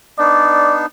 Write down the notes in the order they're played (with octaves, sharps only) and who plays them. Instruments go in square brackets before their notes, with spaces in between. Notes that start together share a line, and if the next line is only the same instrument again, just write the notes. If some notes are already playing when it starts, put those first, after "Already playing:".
[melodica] B3 D4 D#4 [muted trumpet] D5